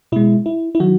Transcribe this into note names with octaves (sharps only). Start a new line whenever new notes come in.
B2 G#3 E4
E4
E4
D#3 F#3 F#4